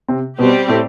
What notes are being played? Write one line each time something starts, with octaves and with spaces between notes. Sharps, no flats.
C3 C4
B2 G3 B3 C4 G4
A2 A3